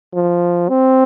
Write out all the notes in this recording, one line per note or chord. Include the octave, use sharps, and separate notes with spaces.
F3
C4